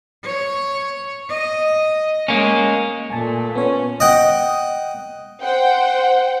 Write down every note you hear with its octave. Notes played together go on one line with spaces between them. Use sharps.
C#5
D#5
G#3 A#3 C#4
A#2 A3 G#5 A5
B3 C#4 C#5
D#5 F#5 G5
C5 F#5 G5